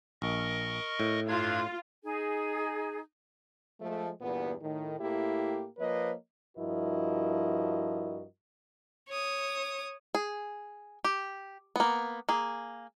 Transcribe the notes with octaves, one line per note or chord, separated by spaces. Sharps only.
A#1 A#4 D#5 C#6
A2
G2 D4 F4 G#6
D#4 G#4
F3 G#3 A3
E2 G2 A#2 B3
A2 D#3
A2 A#3 E4 G4
F3 A#3 B4 C#5 D#5
G2 F3 E4 F#4 A#4 D#5
C#5 D#6
G#4
G4
A#3 B3
A#3 G#4